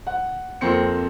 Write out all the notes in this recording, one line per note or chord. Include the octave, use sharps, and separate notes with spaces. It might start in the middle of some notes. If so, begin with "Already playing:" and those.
F#5
F2 A#3 C4 C#7